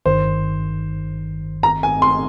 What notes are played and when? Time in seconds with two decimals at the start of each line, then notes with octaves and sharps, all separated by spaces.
0.06 G1 G2 D#3 C5
1.63 A#5
1.83 G#5
2.02 C6